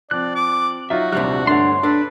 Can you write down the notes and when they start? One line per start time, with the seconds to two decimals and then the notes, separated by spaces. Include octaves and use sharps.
0.11 F3 C4 D5 F#6
0.35 D6
0.90 F#3 D#4 F4 F#4 E5
1.12 D#1 C3 F3 G3 D4 F#6
1.47 G1 A3 D4 C#5 F#5 C6
1.83 D4 A4 B4